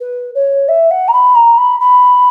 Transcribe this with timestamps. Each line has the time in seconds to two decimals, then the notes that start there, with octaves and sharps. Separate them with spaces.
0.01 B4
0.35 C#5
0.69 E5
0.91 F#5
1.08 A#5
1.13 B5
1.35 A#5
1.58 B5
1.80 B5